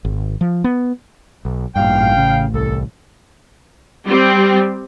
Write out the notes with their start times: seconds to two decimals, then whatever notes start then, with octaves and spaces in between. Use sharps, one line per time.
0.05 G#1
0.41 F3
0.64 B3
1.45 B1
1.76 A1 G2 A#2 F5 G5
2.17 C#3
2.54 C2 A4
4.06 G3 C4